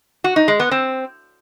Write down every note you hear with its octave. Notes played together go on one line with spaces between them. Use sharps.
F#4
D#4
G#3
B3
C4